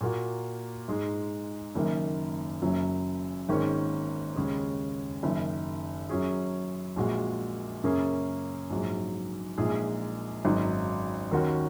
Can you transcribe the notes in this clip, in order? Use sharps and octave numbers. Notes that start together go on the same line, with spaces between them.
A#2 A#3 F#4
G#2 G#3 D#4 G#4
F#1 F#2 D#3 A#3
F#1 F#2 F#3
G#1 G#2 D#3 A#3 C#4
D#2 C#3 G#3 C#4 G#4
F#1 F#2 D#3
F#2 F#3 C#4 G#4
A#1 A#2 G#3 F#4
F#2 C#3 A#3 C#4 G#4
A#1 G#2 F#3
A#1 A#2 G#3 D#4 G#4
G#1 F#2 F#3 D#4
D#2 D#3 A#3 C#4 F#4